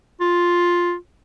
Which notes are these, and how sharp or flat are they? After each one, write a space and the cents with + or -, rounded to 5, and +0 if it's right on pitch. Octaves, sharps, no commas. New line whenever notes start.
F4 +5